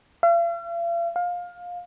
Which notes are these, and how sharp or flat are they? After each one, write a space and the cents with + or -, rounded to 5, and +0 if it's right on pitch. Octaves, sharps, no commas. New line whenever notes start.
F5 -45
F5 +20